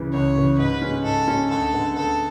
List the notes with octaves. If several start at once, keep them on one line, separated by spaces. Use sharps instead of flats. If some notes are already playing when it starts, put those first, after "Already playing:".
Already playing: C#2 C#3 E3
C#2 C#5
C#3 E3
G#2 B4
G#3 C#4
G#2 A4
G#3 C#4
D2 A4
D3 G#3 B3
D2 A4